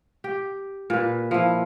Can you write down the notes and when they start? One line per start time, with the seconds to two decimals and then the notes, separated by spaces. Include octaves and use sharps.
0.24 G4
0.90 A#2 B4
1.31 F3 E4